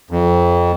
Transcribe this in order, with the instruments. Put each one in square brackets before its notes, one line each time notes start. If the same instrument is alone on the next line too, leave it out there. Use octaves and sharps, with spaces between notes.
[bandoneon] F2